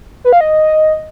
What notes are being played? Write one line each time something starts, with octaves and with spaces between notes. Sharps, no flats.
B4
F5
D#5